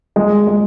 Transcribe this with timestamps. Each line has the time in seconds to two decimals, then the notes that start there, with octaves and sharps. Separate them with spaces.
0.16 G#3
0.47 G#3